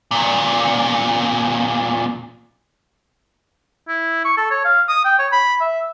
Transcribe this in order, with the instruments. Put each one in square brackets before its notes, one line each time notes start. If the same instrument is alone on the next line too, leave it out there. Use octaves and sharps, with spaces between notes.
[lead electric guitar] E2 A#2
[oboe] E4
C#6
A4
C#5
F5
D#6
G5
C#5
B5
E5